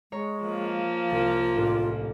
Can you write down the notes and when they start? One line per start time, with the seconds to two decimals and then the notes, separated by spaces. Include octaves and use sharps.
0.12 G#3 C#5 A#5 C#7
0.43 F3 A#3
1.11 C2 F4
1.56 A1 D4 D6